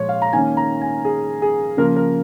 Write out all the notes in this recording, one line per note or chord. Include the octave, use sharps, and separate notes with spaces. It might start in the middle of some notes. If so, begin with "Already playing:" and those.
Already playing: A#2 F3 G#3 C#5
F5
A#5
D#3 A#3 C#4 G#5
A#5
G#5
G#4
G#4
C#3 F3 A#3 A#4
A#4